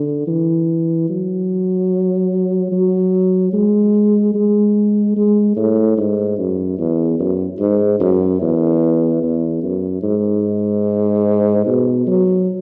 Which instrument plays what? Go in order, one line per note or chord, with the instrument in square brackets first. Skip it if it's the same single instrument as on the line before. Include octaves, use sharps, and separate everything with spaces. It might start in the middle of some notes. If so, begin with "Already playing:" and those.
Already playing: [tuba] D3
E3
F#3
F#3
G#3
G#3
G#3
A2
G#2
F#2
E2
F#2
G#2
F#2
E2
E2
F#2
G#2
B2
F#3